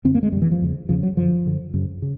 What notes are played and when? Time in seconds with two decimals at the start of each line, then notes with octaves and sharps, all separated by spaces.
0.05 F#2 D3 C4
0.14 A#3
0.23 G#3
0.32 F#2 D3 G3
0.42 E3
0.52 F3
0.61 E2 C#3
0.89 E2 C#3 F3
1.03 F#3
1.17 F#2 D3 F3
1.46 F#2 D3
1.74 F#2 C#3
2.02 C#3